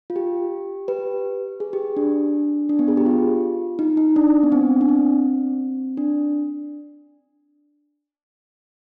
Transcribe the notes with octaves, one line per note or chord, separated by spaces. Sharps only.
F4
G4
G4 B4
G#4
G4
D4
D4
B3
G#4
G4
F4
D#4
D#4
D4
B3
C4
D4
C4
D4